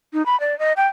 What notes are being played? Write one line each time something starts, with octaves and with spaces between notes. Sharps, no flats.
D#4
B5
D5
D#5
G5